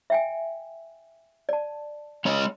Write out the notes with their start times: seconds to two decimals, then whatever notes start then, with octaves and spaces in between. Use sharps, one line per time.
0.10 E5 G5 G#5
1.49 D5 A5
2.25 G#3 C#5 D#5